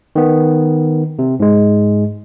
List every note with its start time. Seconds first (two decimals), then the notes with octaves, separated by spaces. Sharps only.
0.16 D#3 B3
1.19 C3
1.40 G#2 G#3